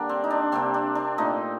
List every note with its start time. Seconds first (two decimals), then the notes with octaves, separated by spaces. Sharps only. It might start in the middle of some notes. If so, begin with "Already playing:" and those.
Already playing: D3 G3 A#3 D4
0.09 C4
0.24 D#4
0.30 D4
0.52 C3 G3 A#3 C4
0.74 D4
0.95 D4
1.18 A#2 A3 D#4